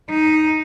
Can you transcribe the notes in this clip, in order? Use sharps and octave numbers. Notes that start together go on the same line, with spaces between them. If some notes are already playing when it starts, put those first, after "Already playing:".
D#4